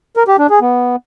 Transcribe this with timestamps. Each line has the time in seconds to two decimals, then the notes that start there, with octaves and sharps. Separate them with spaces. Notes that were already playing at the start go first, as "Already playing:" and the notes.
0.17 A#4
0.28 G4
0.39 D4
0.50 G#4
0.61 B3